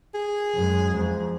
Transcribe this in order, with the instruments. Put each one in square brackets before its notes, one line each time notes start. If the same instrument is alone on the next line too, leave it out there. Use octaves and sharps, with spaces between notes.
[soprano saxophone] G#4
[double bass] F#2 G#3
F2